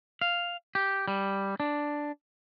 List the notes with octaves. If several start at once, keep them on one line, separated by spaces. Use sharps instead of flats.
F5
G4
G3
D4